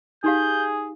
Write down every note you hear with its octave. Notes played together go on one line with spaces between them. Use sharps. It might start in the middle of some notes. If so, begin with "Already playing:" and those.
D#4 G4 G#4 F5 G6